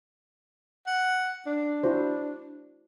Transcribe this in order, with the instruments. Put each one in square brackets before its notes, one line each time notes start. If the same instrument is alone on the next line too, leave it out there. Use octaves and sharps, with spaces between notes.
[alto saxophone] F#5
D4
[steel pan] E4 F#4 C5